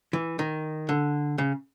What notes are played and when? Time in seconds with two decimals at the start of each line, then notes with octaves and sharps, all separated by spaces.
0.13 E3
0.39 D#3
0.89 D3
1.38 C#3